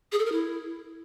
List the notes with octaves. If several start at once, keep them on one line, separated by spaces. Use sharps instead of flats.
G#4
A4
A#4
E4